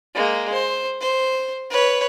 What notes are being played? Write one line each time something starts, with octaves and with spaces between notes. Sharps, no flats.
G#3 A#3
C5
C5
B4 C#5